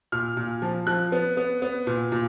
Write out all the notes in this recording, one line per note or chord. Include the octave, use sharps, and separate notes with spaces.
A#2 F6
A#2
F3
F3 F#6
B3
B3
B3
A#2
A#2